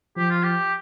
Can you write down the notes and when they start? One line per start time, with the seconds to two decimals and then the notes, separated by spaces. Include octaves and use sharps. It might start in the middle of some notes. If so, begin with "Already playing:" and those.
0.16 F3 G4
0.30 F4
0.43 G4